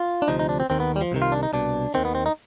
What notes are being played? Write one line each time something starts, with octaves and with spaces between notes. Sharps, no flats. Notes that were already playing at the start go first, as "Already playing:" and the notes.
Already playing: F4
D4
D2 C3 F3 D#4
D#4
D4
C4
D#2 D#3 C4
B3
G3
F3
C2 C3 D#3
F4
D4
D#4
C2 B2 D4
D#2 D#3 C4
B3
C4
D#4